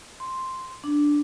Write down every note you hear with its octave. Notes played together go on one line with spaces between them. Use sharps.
C6
D4